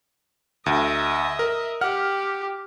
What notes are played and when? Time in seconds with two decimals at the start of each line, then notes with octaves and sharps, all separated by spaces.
0.66 D2 D#5 E5
1.39 A#4
1.81 G4 F#5 F6